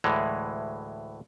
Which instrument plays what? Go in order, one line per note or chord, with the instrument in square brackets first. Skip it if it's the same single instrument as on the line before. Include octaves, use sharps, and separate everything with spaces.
[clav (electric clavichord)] D2 A2 E3 G#3